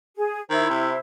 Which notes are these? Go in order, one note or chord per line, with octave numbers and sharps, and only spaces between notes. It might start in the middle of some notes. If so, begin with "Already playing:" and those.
G#4
D#3 E4 C5
C3